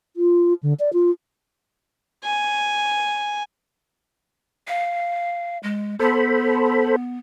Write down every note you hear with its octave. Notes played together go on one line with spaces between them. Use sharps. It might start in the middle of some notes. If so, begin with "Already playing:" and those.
F4
D3
D5
F4
G#5
F5
G#3
B3 A4 C5 B5